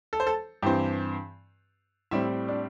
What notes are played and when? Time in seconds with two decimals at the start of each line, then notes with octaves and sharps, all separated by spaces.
0.13 A4
0.20 C5
0.27 A4
0.62 G2 E3 C4 G4
2.11 A2 G3 C4 E4
2.48 D4